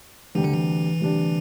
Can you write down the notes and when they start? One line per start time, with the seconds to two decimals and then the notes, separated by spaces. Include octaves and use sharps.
0.35 D2 C3 E3 G3 D4 G4
0.44 D3
0.53 E3
1.00 D2 C3 G3 D4 G4